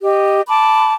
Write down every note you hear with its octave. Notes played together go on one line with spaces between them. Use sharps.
G4 D#5
A5 B5 D6